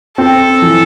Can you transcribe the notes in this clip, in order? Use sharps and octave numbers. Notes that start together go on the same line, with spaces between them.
C4 A4
E3